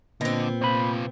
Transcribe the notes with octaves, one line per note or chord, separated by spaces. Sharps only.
A#2 D3 B3 C4 D#5
C3 F4 C5 B5